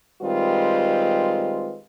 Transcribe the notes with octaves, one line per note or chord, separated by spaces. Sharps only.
D#3 G3 G#3 C4 F4 B4